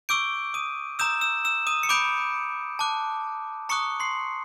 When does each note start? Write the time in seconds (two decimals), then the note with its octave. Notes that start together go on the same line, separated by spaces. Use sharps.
0.09 C#6 D6 E6 G6 D7
0.54 D#6 D#7
0.99 A#5 D#6 E6 G6 E7
1.21 E6 E7
1.45 E6 E7
1.67 D#6 D#7
1.83 C#7
1.89 B5 D6 D#6 G6 D7
2.79 A5 D6 F#6
3.69 A#5 C#6 D#6 F#6 C#7
4.00 C6 C7